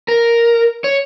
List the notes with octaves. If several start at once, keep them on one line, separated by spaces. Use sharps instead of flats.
A#4
C#5